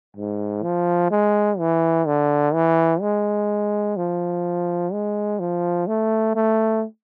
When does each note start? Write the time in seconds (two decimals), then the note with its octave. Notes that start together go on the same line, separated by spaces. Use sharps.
0.16 G#2
0.63 F3
1.11 G#3
1.59 E3
2.07 D3
2.54 E3
3.01 G#3
3.97 F3
4.93 G#3
5.40 F3
5.87 A3
6.35 A3